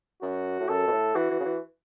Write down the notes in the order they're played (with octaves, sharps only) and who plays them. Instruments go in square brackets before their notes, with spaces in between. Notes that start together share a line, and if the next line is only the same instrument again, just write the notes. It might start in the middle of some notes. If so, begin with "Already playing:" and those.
[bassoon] F#2 [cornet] F#4
[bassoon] A2
[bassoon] F#2 [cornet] A4
[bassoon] B2
A2
[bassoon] E3 [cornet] F#4
[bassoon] E3
C#3
E3